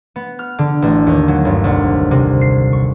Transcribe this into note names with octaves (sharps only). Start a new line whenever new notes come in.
B3
F6
D3
A1
D#2
F#3
G1
C2
C3
C7
C#6